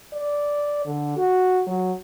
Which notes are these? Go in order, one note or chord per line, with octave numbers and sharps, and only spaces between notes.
D5
D3
F#4
F#3